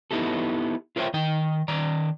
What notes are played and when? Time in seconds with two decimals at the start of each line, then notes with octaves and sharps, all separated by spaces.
0.11 B3 D#4 E4 G4 A4
0.96 F4 A#4 C5 C#5 E5 G5
1.14 D#3 D#5 G5
1.68 D#3 D5 A#5